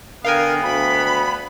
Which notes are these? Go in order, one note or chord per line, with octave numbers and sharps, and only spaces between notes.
D3 B3 A#4 F5 G5 G#5
D2 B5